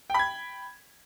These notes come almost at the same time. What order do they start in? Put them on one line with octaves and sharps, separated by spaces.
G5 B5 G#6